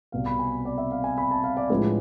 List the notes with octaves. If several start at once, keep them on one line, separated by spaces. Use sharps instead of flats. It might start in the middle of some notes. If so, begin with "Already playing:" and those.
C2 B2 B3 F5
B5
G#5
D5
E5
F5
G#5
B5
A5
F5
D5
A2 F3 G#3 D4 B4